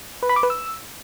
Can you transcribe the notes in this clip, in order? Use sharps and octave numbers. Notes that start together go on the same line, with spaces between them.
B4
B5
D6
B4
E6